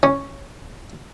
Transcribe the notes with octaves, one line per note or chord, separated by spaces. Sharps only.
C#4